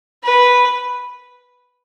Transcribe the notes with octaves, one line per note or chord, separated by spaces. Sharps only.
B4